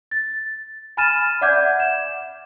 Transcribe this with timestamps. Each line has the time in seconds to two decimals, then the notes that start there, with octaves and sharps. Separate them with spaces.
0.11 A6
0.97 G#5 B5 F6 A6 D#7 E7
1.41 D5 E5 F#5 D6 G6 G#6
1.80 E7